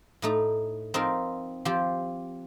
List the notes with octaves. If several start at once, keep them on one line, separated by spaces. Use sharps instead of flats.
A2 A3 D#4
F3 C4 D#4 A#4
F3 C4 G4